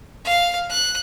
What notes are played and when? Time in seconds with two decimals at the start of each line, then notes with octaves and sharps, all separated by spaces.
0.25 F5
0.70 F#6